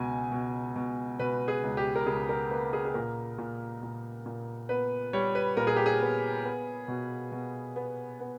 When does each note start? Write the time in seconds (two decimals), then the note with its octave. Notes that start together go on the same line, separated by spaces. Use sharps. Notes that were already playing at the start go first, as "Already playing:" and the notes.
Already playing: C#2 B2 G#5
0.32 B2
0.76 B2
1.19 B2 B4
1.48 G#4
1.63 C#2
1.77 G4
1.95 A#4
2.06 C#2 G#4
2.29 A#4
2.51 A#3 B4
2.73 G#4
2.85 G#4
2.94 A#2 A#4
3.38 A#2
3.83 A#2
4.26 A#2
4.69 B3 B4
5.13 G3 C#5
5.35 B4
5.57 A#2 A#4
5.67 G#4
5.76 G4
5.86 G#4
6.01 B3
6.44 B3
6.88 B2
7.32 B2
7.76 B3
8.20 B3